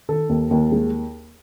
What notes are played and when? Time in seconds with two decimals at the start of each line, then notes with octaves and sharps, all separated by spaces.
0.09 D#3 A4
0.29 D#2
0.51 D#2
0.72 G#3